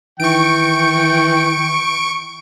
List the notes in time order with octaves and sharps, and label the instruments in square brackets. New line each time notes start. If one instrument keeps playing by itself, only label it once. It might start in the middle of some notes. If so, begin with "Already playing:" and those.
[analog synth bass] D#3 [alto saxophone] E3 [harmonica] G5 [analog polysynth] C#6 D7